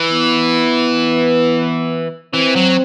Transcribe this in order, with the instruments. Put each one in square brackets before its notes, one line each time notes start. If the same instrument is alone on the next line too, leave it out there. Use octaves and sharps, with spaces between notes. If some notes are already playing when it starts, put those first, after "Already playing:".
Already playing: [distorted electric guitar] E3
[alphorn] B3
[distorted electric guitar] E3 [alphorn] C4
[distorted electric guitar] F#3